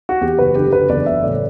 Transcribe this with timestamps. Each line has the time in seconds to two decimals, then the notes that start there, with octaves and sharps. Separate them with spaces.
0.09 F#4
0.21 E2 G4
0.39 F#1 B4
0.55 D3 G4
0.72 F#1 B4
0.89 E2 D5
1.06 F#1 E5
1.23 A2 D5